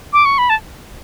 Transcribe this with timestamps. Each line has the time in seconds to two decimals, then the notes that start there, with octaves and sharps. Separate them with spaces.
0.13 D6
0.25 C#6
0.38 B5
0.50 A5